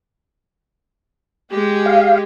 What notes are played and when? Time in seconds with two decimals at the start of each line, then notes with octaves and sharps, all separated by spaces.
1.51 G#3 G4
1.86 F5